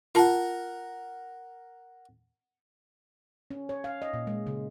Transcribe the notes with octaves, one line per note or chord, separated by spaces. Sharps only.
F4 A#4 F#5 A5
C#4
C#5
F5
D#5
A#2
G#3
C#3